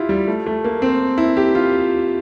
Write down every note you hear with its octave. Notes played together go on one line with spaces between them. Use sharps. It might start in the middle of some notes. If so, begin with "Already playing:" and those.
Already playing: E4 F4 G4
G3
A3
A3
A#3
C4
E4
G4
F4